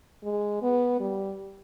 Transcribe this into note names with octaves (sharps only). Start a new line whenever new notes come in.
G#3
B3
G3